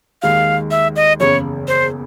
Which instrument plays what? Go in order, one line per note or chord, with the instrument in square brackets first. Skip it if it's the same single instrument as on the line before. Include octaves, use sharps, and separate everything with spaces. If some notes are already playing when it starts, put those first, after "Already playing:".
[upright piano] D#2 D#3 G#3 [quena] F5
[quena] E5
D#5
[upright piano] F#1 E2 C#3 [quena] C#5
[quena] C5